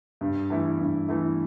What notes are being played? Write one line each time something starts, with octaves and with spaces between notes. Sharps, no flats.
G2
E3 A3 E4
G2
E3 A3 E4